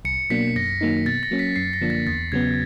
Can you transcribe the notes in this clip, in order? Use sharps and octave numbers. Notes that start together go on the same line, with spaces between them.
C2 C#7
B2 F#3 A#3 D4 B6
F#2 A#6
D#3 F#3 A#3 D#4
B2 A6
A#6
F#3 A#3 C#4
B6
F#2 C7
A#6
D3 F3 A#3 D4
A6
E2 A6
C#3 F#3 B3 G#6